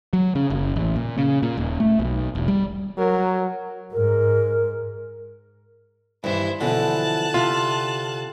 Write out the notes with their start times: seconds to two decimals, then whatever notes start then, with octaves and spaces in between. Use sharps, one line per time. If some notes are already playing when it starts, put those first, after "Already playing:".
0.13 F#3
0.35 C#3
0.50 F#1
0.76 A1
0.96 A#2
1.18 C#3
1.43 A#2
1.57 D#1
1.80 A3
1.99 B1
2.35 E1
2.48 G3
2.98 F#3 A#4
3.93 G#2 A#4
6.24 G2 D#3 E3 E4 C5
6.61 B2 D3 E3 F3 A5 F#6
7.34 C3 F4